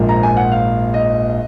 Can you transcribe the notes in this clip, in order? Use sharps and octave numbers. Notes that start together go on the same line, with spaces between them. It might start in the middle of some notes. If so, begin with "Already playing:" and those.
Already playing: A#1 G#2 F3 A#3
A#5
G#5
F#5
F5
D#5